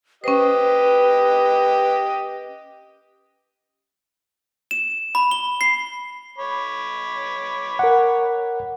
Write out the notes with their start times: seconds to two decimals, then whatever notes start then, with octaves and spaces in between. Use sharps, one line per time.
0.24 C#4 G4 B4 C5 D#5
4.71 E7
5.15 B5
5.31 G7
5.61 C7
6.38 C#5 B5 D6
7.79 A#4 F#5